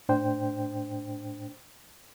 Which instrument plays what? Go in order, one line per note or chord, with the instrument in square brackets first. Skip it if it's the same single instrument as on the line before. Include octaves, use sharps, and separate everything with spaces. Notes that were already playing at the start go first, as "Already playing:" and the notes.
[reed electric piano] A2 D4 C5 G5